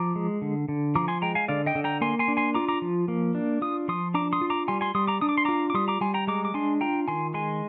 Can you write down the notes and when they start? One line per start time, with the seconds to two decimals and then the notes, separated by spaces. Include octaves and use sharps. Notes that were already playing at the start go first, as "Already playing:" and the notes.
Already playing: F3 A#5 D6
0.16 G#3
0.42 D3
0.69 D3
0.95 F3 A#5 D6
1.08 G#5 C6
1.22 G#3 G5 A#5
1.35 F5 G#5
1.48 D3 D5 F5
1.66 D#5 G5
1.75 D3
1.84 G5 A#5
2.01 A#3 G#5 C6
2.19 G#5 C6
2.28 D4
2.37 G#5 C6
2.54 F4 A#5 D6
2.68 A#5 D6
2.82 F3
3.08 A#3
3.35 D4
3.62 F4 D#6
3.88 F3 C6 D#6
4.14 D4 A#5 D6
4.33 C6 D#6
4.41 F4
4.50 A#5 D6
4.68 G3 G#5 C6
4.81 G#5 C6
4.95 G3 C6 D#6
5.07 A#5 D6
5.21 D4 D#6
5.29 D6
5.38 C6
5.45 F4 A#5 D6
5.70 D6
5.74 G3 C6 D#6
5.88 A#5 D6
6.01 G3 G#5 C6
6.14 G5 A#5
6.27 G#3 A#5 D6
6.45 D6
6.54 D4 G#5 C6
6.81 F4 G5 A#5
7.08 D#3 G#5 C6
7.34 G#3 G#5 C6